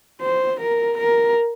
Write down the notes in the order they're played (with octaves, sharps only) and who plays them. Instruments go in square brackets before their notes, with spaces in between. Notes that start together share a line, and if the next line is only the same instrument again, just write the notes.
[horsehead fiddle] C5
A#4
A#4